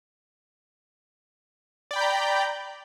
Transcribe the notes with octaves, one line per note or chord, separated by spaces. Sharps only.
D5 G5 A#5 B5 G6